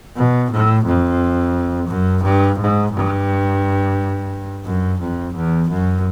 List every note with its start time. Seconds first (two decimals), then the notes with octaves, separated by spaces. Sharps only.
0.16 B2
0.51 A2
0.85 F2
1.88 F#2
2.24 G2
2.58 G#2
2.93 G2
4.65 F#2
5.01 F2
5.35 E2
5.69 F#2